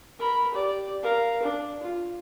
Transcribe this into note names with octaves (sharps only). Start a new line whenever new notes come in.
A#4 B5
G4 D5
A#4 F5
D4
F4